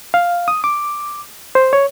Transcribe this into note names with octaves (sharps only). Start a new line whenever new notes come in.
F5
D#6
D6
C5
C#5